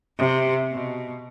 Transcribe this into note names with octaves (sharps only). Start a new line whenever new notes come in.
C3
B2